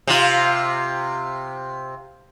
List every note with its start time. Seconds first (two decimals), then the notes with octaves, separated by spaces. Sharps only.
0.07 C3 F4